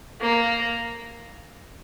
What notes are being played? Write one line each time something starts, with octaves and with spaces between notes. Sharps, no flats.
A#3